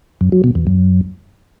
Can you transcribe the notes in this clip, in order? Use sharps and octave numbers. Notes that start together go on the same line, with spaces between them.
F#2
F#3
B2
E2
F#2